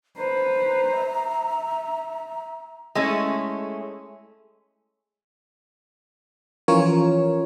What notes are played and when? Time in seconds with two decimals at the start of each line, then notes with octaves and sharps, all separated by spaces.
0.17 B4 C5 A#5
1.01 E5
2.95 G#3 A3 C#4 E4
6.68 E3 F3 C#4 F4 A#4 C#5